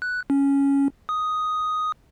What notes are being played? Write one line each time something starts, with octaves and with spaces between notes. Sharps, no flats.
F#6
C#4
D#6